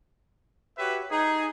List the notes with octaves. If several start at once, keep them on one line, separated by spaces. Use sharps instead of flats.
F#4 G4 B4 C#5 E5
D#4 G#4